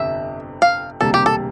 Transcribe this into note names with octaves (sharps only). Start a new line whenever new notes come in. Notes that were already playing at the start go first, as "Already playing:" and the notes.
Already playing: G1 F2 C3 E5
F5
E1 D2 C3 G3 A#3 A4
G4
A4